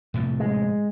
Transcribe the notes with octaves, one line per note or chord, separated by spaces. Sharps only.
A2 C3 F3
G#3